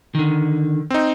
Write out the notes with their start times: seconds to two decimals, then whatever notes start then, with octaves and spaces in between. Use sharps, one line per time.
0.15 D3 D#3
0.90 C4 D#4